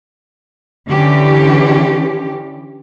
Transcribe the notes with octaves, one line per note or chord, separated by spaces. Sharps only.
D3 E3 C#4 G4